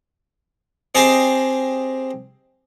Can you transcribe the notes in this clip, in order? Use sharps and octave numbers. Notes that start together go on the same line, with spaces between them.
C4 G4 G#4 D#5 G#5 A5